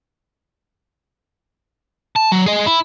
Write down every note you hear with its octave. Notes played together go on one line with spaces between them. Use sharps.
A5
F#3
G#4 D#5
E4